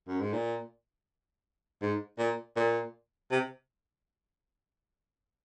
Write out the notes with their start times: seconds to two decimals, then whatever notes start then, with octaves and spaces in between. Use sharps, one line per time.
0.08 F#2
0.21 G#2
0.33 A#2
1.82 G#2
2.19 A#2
2.56 A#2
3.31 C3